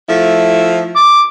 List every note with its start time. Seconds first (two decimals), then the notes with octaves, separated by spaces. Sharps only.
0.09 F3 A3 E4
0.95 D6